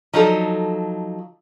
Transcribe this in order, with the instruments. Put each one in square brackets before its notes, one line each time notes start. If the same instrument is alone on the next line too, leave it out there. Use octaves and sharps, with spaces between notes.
[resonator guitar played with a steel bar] F3 F#3 D#4 A4